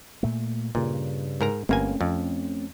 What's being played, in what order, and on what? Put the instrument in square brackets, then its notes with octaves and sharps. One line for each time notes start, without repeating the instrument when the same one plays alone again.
[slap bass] A#2 A3
[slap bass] G2 C#3 [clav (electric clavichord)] A#2
[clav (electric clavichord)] G#2 A#4 A#5
[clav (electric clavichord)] G1 A#3 G#5 [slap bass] A3 C4 C#4
[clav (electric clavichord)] F2